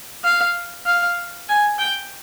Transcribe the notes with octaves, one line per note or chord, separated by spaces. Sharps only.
F5
F5
G#5
G5